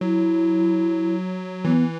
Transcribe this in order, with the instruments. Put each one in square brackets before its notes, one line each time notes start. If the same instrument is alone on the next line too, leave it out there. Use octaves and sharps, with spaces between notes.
[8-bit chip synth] F#3 [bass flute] E4
[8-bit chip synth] E3 [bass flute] B3